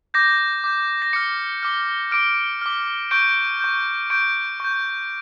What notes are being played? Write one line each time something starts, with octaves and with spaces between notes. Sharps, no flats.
D6 G6 A#6
D6 G6
A#6
D6 F6 C#7
D6 F6
D6 F6 D7
D6 F6
C#6 G6 D7
C#6 G6
C#6 G6 D7
C#6 G6